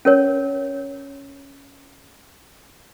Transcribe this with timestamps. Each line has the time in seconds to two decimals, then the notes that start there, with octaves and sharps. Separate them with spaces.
0.05 C#4 A#4 C#5